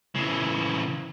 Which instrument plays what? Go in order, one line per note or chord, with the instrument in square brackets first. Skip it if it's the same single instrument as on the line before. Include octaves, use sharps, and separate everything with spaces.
[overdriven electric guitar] C#3 E3